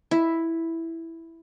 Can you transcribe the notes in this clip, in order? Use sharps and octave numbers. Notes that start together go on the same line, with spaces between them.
E4